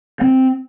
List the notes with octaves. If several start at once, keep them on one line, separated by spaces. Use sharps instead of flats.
C4